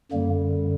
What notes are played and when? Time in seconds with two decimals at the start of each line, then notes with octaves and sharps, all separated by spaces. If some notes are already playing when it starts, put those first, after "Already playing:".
0.12 F#2 D3 G3 A#3